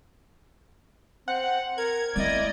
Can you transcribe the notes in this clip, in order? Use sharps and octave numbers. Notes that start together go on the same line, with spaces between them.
C4 F#5
A#4 G#6
A3 C4 E4 D5 D#5 G#6